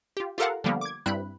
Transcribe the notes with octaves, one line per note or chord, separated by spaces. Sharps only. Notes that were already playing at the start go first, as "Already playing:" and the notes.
F4 G4
F4 G4 A4 A#4 F5 F#5
D3 F3 G3 A#3 B3
D6 G#6
G2 G3 C4 E4 B5 F#6